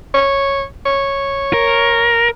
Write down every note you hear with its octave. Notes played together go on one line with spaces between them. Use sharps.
C#5
C#5
A#4